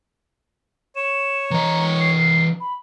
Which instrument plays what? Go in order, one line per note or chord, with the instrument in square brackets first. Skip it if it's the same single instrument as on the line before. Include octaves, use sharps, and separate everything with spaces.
[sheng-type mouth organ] C#5 [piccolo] E7
[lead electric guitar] E3 D#5 [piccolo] A#5
[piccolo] C7
B5